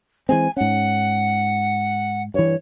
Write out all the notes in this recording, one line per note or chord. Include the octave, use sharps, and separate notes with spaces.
E3 G#3 C4 G#5
G#2 C#4 F#5
G2 E3 C#5